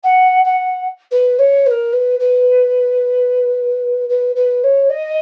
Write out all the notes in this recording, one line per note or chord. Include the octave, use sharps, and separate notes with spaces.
F#5
F#5
B4
C#5
B4
A#4
B4
B4
B4
B4
C#5
D#5